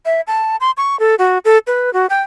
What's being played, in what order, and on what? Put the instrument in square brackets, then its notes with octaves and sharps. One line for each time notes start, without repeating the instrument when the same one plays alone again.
[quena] E5
A5
C6
C#6
A4
F#4
A4
B4
F#4
G5